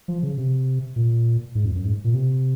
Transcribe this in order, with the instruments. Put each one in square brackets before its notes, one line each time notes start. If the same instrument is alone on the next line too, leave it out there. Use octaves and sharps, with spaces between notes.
[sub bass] F3
C#3
C3
A#2
G#2
F2
F#2
G#2
A#2
C3